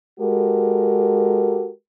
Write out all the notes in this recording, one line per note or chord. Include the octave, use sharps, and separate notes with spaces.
G#3 F#4 G4 A4 A#4